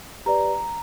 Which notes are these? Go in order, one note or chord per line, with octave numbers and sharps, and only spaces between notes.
G4 B4 D5 A#5